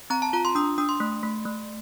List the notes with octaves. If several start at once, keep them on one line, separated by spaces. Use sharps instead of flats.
C4 A#5
A5
F4 A#5
C6
D4 D#6
D4 D#6
C6
A3
A3
A3